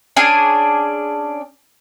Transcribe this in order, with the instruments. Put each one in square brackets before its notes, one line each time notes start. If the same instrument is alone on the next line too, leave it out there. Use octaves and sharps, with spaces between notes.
[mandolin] C#4 D4 G#4 G#5